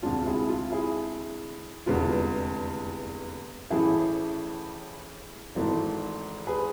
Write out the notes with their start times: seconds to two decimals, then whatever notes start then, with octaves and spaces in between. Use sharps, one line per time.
0.02 D2 C3 G#3 D4 F4
0.26 E4 G#4
0.49 F4
0.72 E4 G#4
1.86 F1 E2 D3 G#3 B3 F4
3.70 A1 A2 E3 A3 E4 G#4
5.55 G#1 G#2 E3 A3
6.47 G#4 B4